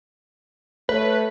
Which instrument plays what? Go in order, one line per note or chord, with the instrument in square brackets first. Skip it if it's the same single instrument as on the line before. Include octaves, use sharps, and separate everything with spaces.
[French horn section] A3 C#5 [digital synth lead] B4